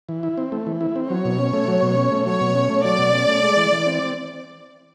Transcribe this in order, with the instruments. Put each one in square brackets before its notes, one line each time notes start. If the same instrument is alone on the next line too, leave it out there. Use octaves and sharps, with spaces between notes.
[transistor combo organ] E3
E4
C4
A3
E3
E4
C4
[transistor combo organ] F#3 [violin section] C#5
[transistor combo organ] B2
C#4
A3
F#3
B2
C#4
A3
[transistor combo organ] F#3 [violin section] C#5
[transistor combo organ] B2
C#4
A3
[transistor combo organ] F#3 [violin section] D5
[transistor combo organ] B2
C#4
A3
G#3
E3
E3
C4